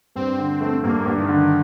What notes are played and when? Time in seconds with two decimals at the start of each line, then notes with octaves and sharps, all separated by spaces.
0.16 G2 C4
0.38 D3
0.61 A3
0.83 G2 A#3
1.06 G2
1.18 D#3
1.28 D3